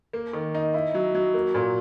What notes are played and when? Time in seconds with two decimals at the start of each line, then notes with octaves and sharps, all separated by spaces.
0.13 A#3
0.33 D#3
0.55 D#4
0.74 E4
0.94 F#3
1.15 F#3
1.34 A#3
1.54 A#2